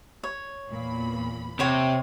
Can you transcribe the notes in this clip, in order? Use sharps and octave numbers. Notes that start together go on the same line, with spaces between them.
C#5
E2 A#2 B5
C3 C5 C#5 G5